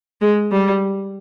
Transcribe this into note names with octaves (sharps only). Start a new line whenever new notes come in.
G#3
G3